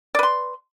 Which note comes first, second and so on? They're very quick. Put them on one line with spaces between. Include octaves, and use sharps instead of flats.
D5 B4 C6